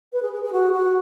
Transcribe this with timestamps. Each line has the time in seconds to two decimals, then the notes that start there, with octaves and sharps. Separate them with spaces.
0.13 B4
0.22 G#4
0.33 G#4
0.43 G#4
0.53 F#4
0.73 F#4